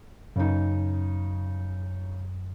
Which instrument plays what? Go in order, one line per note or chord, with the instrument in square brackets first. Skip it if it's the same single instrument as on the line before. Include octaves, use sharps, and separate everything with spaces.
[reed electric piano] F#2 [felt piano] C#3 D#4